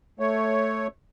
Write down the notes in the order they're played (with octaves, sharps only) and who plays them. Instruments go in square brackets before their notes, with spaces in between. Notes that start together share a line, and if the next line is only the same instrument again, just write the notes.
[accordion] A3 C#5